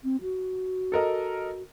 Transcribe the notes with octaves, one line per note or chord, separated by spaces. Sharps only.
C4
F#4
A4 A#4 D#5